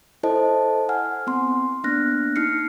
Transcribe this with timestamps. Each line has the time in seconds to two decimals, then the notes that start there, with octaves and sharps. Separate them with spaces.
0.23 E4 A4 C5 D#5 A5
0.89 F#5 G#5 F6
1.27 B3 C4 C6
1.84 A#3 B3 D4 F6 F#6 A#6
2.36 D#4 F6 C7 C#7